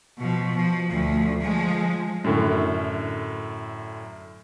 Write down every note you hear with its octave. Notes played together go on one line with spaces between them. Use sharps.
B2 F3
F3
D2 F3
F3 G#3
F#2 A2 D3